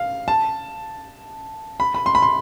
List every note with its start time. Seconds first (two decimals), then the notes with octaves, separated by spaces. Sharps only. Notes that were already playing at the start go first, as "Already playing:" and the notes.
Already playing: F5
0.28 A5
1.80 B5
1.94 B5
2.06 C6
2.15 B5
2.22 C6